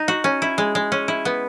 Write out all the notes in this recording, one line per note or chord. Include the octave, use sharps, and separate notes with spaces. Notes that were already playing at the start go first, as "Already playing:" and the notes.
Already playing: D#4
F#4
C#4
E4
G#3
G#3
C#4
E4
B3